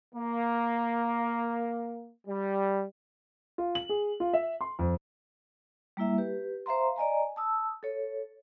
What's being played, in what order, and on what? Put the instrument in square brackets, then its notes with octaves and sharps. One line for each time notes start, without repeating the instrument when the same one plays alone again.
[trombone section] A#3
G3
[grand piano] F4
F#7
G#4
F4
E5
C6
F2
[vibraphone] G3 A#3 E4 E5
G4 B4
C5 E5 F5 A#5 C6
D5 D#5 G#5 A#5
A5 D#6 E6
A4 C#5